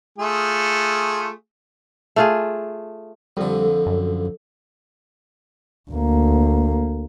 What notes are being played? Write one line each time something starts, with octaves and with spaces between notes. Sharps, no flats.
A3 F4 G#4
A3 F4 G#4
F2 D3 G3 A4
F#2
D2 A#3